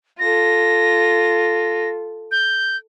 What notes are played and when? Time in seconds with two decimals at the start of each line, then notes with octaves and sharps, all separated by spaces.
0.19 F4 A4 A#6
2.31 G6